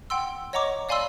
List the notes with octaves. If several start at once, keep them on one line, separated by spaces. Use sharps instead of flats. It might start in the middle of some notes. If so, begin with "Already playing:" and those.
F#5 G5 C6 E6
C#5 D#5 F#5 A#5 C#6 D6
D5 F5 G#5 B5 C6 E6